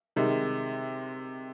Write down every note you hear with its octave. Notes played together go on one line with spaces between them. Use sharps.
C3 D#3 G#3